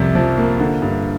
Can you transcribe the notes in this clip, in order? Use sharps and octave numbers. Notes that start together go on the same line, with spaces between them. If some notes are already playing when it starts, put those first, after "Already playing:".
Already playing: C2 F2 C3
F3
A#3
D3
G2